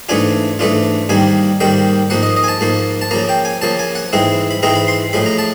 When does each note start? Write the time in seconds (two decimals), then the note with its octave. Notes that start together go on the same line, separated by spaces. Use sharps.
0.09 G#2 E3 A3 D4 F4 G#5
0.59 G#2 E3 A3 D4 F4
1.09 G#2 D#3 G3 A#3 G#5
1.60 G#2 D#3 G3 A#3 G5
2.10 G#2 F3 A#3 F#5
2.23 D#5
2.36 D#5
2.44 G#5
2.48 A5
2.61 G#2 F3 A#3
3.01 A5
3.11 C#3 F3 A#3 A#5
3.29 G5
3.45 G#5
3.61 C#3 F3 A#3 A5
3.79 G#5
3.95 F#5
4.13 G#2 E3 G#3 C4 E4
4.51 B5
4.63 G#2 E3 G#3 C4 E4 A#5
4.75 B5
4.88 C6
5.13 A2 F3 G#3 B5
5.26 A#5
5.38 A5